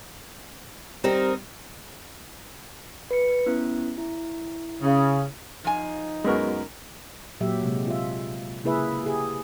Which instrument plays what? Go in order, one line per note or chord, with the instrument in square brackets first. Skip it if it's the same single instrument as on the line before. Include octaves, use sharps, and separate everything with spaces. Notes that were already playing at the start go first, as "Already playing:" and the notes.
[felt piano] G3 [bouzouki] C4 D#4 A#4
[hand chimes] B4 C#7
B3 C#4 E4
E4
[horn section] C#3
[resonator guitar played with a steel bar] F3 F5 G#5 [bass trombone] D#4
[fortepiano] F#2 A#4 [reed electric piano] G#3 B3 F#4
[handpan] A#2 F#3 G4 E5
C3 G#3
F4 E5
C#3 A#3 E4 G#4 B4 E5
G4 G#4